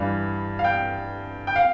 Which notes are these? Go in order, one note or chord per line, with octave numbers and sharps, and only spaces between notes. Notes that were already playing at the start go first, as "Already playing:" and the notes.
Already playing: G2 E3 G3 F5
F5
G5
G5
F5